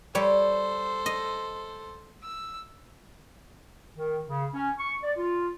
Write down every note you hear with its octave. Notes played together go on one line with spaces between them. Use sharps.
G3 A4 C5 C#5
D#5
E6
D#3
C#3
C#4
C#6
D5
F4